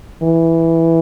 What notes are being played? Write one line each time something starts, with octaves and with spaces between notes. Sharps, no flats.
E3